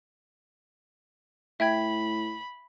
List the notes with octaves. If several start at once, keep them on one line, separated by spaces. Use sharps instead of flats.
A2 E5 G5 B5 G#6